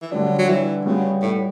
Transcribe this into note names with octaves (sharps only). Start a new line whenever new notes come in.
E3
D3 F#3 G3 D4
F#3
E3
C#3 G3 B3 F#4
A2